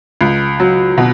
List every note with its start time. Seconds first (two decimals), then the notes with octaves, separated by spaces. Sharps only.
0.21 C#2
0.60 F#3
0.98 B2